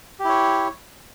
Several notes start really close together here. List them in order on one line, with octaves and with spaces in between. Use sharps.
G4 E4 C#5